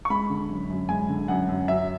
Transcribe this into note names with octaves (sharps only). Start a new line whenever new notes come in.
C#6
G#3 B5
D3
F#2
F#2
G#3 G#5
D3
F#2 F#5
F#2
F#3 E5